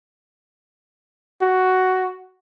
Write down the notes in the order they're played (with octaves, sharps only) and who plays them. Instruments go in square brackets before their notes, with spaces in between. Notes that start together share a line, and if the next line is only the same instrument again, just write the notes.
[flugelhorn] F#4